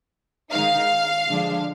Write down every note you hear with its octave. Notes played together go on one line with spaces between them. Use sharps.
D#3 G#3 D#4 F5
D3 F3 G#3 D4